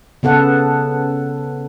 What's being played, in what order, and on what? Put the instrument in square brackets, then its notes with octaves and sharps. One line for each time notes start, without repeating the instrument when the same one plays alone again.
[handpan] C#3 B3 A4 F#5